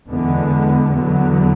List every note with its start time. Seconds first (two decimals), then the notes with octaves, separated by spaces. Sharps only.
0.08 E2 D3 G#3 B3
0.92 E2 D3 F#3 B3